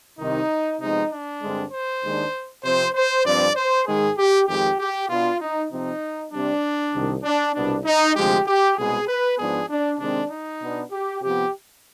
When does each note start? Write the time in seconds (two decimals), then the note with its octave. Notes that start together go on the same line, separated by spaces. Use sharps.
0.18 C2 C3 D#3 D#4
0.80 C3 F3 G#3 B3 D#4
1.11 D4
1.41 G2 D3 G#3 C4
1.72 C5
2.03 D#2 D#3 G#3 D4
2.64 C3 F3 C4 C5
2.94 C5
3.25 G2 F3 C4 D5
3.56 C5
3.87 G#2 D#3 G#3 G#4
4.18 G4
4.48 F2 D#3 G#3 G4
4.79 G4
5.09 B2 B3 D4 F4
5.40 D#4
5.70 C3 F3 C4 D#4
6.32 C3 G3 C4 D4
6.93 C2 C3 D#3
7.23 D4
7.54 C2 B2 B3 D4
7.85 D#4
8.15 D2 C3 F3 G#3 G4
8.46 G4
8.77 C2 B2 G#3 G#4
9.08 B4
9.38 G#2 F3 B3 D4 G#4
9.69 D4
9.99 C3 D#3 G#3 C4 D4
10.30 D#4
10.61 B2 B3 D4
10.91 G4
11.22 C3 F3 B3 G4